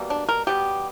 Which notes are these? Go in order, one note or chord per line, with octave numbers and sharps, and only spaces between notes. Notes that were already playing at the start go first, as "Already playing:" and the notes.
Already playing: B2 G3 A#3
D4
A#4
B2 G3 B3 G4